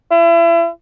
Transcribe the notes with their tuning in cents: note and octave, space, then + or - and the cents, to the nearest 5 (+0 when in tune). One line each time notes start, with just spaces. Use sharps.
E4 +35